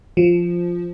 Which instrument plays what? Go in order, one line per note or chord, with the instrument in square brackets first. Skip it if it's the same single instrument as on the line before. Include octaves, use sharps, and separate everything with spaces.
[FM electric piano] F3